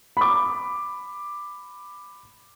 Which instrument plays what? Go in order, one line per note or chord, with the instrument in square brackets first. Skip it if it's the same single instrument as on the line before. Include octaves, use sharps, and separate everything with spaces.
[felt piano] B5 D6